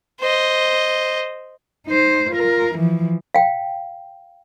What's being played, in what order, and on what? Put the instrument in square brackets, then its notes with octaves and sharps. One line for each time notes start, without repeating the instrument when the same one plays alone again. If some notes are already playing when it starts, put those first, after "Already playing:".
[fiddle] C5 D#5
[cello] D#4 C5
F4 A#4
E3 F3
[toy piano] F5 G5